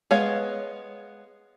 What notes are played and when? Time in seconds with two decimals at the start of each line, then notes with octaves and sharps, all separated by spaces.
0.11 G#3 B3 C#5 F5